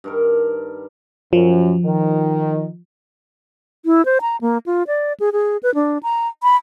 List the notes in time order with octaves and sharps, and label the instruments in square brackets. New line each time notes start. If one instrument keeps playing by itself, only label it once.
[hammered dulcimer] G2 D#3 A#4
[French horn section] F#2 [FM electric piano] F3
[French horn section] D#3
[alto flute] E4
C5
A#5
A#3
F4
D5
G#4
G#4
B4
D4
A#5
B5